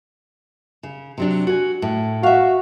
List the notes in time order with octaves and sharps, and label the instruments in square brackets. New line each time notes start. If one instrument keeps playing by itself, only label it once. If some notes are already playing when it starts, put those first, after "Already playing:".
[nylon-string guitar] C#3
C3 F#3 D4
F#4 G#5
A2
[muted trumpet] F#4 [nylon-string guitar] E5 F5